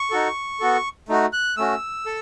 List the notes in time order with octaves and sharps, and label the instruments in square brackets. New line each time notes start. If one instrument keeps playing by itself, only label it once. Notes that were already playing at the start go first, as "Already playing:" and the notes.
Already playing: [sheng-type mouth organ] C#6
D#4 F#4 A4
B3 F#4 A4
A3 D#4 F#4
F#6
A3 C#4 F#4 E6
A4